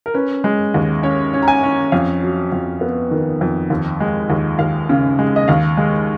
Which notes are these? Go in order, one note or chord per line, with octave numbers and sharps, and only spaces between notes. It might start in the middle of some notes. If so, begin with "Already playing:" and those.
A#4
C#4 B4
G#3
D#2
C#4 C#5
C#4
A#5
G#5
C#4
F2 F5
F#3
F2
B3
D#3
F2
D#2
G#3
D#2
D#2 F5
C#3
G#3
D#5
D#2 F5
G#3